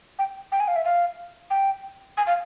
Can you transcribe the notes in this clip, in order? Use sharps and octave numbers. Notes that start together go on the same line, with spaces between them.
G5
G5
G#5
F5
E5
F5
G5
G#5
F5